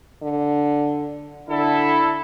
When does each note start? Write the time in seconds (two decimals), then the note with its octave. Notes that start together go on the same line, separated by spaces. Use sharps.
0.22 D3
1.49 D3 E4 A4